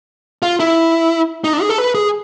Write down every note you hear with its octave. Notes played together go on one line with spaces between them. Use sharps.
F4
E4
D#4
D4
G#4
A4
B4
G#4